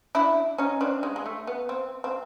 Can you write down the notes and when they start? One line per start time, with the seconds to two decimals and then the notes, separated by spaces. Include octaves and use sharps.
0.15 D4 E4
0.58 C#4 D#4
0.81 C4 D4
1.03 G#3
1.16 G#3
1.26 A3
1.47 B3
1.69 C4
2.04 C4